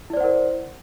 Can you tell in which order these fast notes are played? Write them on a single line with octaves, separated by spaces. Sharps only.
E4 D5 C5 F#5 A#4